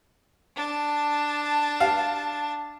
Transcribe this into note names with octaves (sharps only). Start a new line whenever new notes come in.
D4 A5
F5